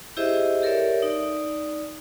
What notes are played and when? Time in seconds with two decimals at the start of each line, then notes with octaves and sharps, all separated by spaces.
0.17 E4 G4 G#4 C5 D#5 E5
0.62 G4 A4 A#4 C#5 D5 E5
1.02 D#4 D5